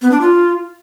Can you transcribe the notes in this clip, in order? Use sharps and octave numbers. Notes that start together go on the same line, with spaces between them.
B3
D4
F4